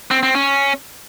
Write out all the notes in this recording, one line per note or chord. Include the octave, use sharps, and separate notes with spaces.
C4
C4
C#4